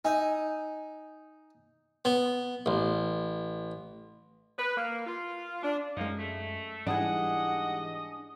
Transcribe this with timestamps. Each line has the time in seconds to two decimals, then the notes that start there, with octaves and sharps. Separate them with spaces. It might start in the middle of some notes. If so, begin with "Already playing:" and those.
0.05 D#4 G#5 E6
2.05 B3
2.66 A1
4.59 B4
4.77 A#3
5.07 F4
5.63 D4
5.97 F#2 F3 G#3 A#3 D#4
6.19 A3
6.87 G#2 E3 G3 D4 G#4 D#5 F#5